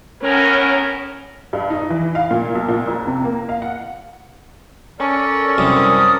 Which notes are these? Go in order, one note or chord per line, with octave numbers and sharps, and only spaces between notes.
A2 B3 C#4 A#4
G2
D#4
E3
F5
A#2
B1
A#2
F#1
C3
A#3
F5
F#5
C#4 A4 A#4 D5
C2 F#2 C3 D#6